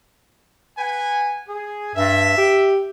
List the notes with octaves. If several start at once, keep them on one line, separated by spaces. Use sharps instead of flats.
B4 F#5 G#5
G#4
G2 E5
G4